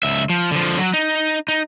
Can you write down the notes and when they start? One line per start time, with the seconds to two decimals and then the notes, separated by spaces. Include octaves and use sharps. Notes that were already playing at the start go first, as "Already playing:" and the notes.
0.03 C#2 E5
0.30 F3
0.51 D3 F3
0.79 F#3
0.94 D#4
1.48 D#4